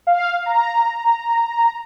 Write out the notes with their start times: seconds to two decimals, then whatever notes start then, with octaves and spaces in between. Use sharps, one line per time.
0.07 F5
0.46 A#5